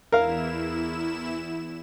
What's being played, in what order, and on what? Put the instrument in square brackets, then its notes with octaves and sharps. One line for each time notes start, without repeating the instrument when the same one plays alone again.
[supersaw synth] E2 E4 E7 [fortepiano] A#4 F5